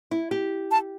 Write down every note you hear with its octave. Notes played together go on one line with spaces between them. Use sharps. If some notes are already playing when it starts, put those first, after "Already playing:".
E4
G4
A5